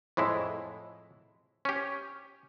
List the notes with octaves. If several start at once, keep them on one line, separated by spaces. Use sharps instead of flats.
F2 A2 G#3 E4
C#4 G4